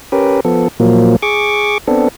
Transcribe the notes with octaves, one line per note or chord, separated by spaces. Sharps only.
C#4 G4 A#4 B4
F3 B3 A4
A#2 F3 F#3 A#3
G#4 C#6 D6
B3 C4 D4 A4